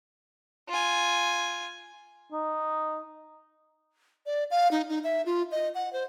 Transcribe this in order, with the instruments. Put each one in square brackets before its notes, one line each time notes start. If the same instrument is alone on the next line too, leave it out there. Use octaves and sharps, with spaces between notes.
[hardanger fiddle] F4 G#5
[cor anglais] D#4
[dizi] D5
F5
D#4
D#4
E5
F4
D#5
F#5
C5